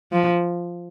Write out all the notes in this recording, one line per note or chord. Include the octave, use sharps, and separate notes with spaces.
F3